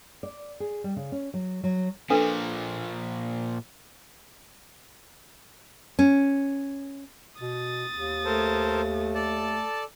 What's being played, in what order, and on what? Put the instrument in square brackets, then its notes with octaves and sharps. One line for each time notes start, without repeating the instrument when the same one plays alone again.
[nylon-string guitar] D5
G#4
G3
C#3
C#4
F#3
F#3
[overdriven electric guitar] A#2 F3 [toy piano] D4 A4 B4
[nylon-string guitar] C#4
[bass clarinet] B2 [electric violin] D#6 A6
[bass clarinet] D#2
[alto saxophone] A3 [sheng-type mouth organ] A4 A#4 C5
[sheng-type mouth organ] A4 D5 A5